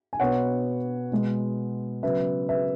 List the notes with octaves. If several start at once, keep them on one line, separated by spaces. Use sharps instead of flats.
G#5
B2 B3 C#5 F#5
B2 G#3 B3
C#3 F#3 B3 B4 E5
B4 E5